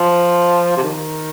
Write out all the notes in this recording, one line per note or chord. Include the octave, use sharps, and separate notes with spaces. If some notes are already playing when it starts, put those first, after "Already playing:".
Already playing: F3
C3
D#3